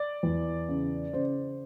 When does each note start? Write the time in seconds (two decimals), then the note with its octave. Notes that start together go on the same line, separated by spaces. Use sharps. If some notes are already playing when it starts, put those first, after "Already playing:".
Already playing: D5
0.23 E2
0.69 C#3
1.13 C#3 C5